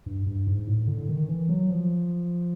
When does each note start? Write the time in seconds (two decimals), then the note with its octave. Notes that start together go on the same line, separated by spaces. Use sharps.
0.06 G2
0.26 G2
0.47 G#2
0.67 A2
0.87 D3
1.09 D#3
1.29 E3
1.49 F#3
1.70 F3